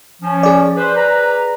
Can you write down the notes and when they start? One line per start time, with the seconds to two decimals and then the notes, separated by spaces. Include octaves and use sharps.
0.22 F3 C#4
0.43 G#4 D5
0.77 B4 C5
0.95 B4 A#5